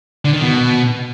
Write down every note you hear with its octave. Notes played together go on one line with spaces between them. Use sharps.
D3
D#3
B2